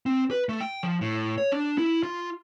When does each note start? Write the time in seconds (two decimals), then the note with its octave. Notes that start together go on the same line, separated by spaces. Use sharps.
0.06 C4
0.31 B4
0.49 A3
0.61 G5
0.83 F3
1.01 A2
1.38 C#5
1.52 D4
1.78 E4
2.03 F4